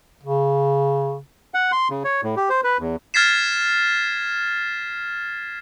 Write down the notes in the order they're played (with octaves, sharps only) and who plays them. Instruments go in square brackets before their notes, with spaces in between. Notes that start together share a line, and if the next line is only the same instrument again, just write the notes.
[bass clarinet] C#3
[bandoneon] F#5
C6
C#3
C#5
A2
G4
C5
B4
E2
[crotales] F6 G#6 A6 B6 C7 E7